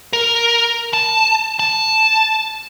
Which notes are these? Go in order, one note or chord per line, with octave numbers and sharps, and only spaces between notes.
A#4
A5
A5